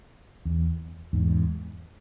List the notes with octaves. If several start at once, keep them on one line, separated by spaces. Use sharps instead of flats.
E2
E2 G#2